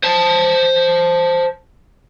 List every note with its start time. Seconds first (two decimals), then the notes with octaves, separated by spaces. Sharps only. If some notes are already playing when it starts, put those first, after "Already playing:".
0.03 C5 A5